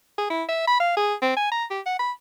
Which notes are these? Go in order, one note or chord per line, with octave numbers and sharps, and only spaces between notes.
G#4
E4
E5
B5
F5
G#4
C4
G#5
A#5
G4
F#5
B5